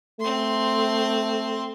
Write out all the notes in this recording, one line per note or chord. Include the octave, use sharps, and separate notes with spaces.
A3 C4 C6